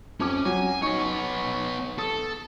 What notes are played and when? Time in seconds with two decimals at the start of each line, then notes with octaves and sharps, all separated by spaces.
0.20 F2 C#4 D6
0.45 F#3 G#5
0.82 B3 D#4 C#5 C#6
1.98 A4 D#6